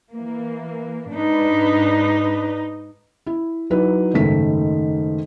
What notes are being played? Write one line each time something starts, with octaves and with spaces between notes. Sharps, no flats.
E3 A#3
G#2 D4 D#4 B4
E4
F#3 D#4 E4 B4
F#1 G#2 D#3 A3 B6